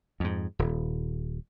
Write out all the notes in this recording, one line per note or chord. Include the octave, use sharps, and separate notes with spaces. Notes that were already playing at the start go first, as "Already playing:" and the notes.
F2 G#2
D#1